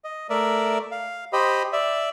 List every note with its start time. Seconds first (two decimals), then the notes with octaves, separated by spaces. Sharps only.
0.04 D#5
0.30 A3 A#4 D5 E5
0.92 F5
1.33 G4 C5 D#5 B5
1.73 D5 E5